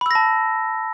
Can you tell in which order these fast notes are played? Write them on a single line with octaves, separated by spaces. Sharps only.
B5 E6 A#6 A5